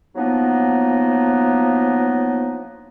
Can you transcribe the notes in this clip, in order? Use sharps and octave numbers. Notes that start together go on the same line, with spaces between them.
F3 F#3 A#3 B3 D4 D#4